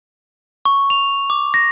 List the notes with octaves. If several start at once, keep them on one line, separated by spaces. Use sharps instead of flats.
C#6
F7
D6
A#6